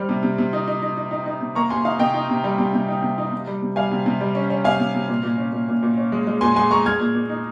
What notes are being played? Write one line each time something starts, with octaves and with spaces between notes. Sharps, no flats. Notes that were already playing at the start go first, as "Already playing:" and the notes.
Already playing: G3 C4 F6
C3
C3
C3
D#4
D#4
D#4
D#4
D#4
D#4
C3
A#3 A#5 C#6
C3 G#5 C6
D#4 F5
C3 D#5 G5
D#4
C3
G3
C3
C3
D#4
C3
D#4
C3
G3
C3
G3 F5 G#5
C3
C3
G3
C#4
C#4
C3 F5 G#5
C3
C3
A#2
A#2
C#4
A#2
A#2
A#2
C#4
G#3
G#3
A#2 G#5 C6
G#3 G#5 C6
G#3 A#5 C#6
G#3 F6 G#6
A#2
A#2
D#4